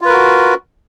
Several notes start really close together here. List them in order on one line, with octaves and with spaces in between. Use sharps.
F4 B4 A#4 F#4